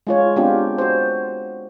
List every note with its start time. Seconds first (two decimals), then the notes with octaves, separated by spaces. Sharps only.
0.07 G#3 F4 C#5
0.36 G#3 B3 C4 D4 F4 G4
0.78 F#4 C5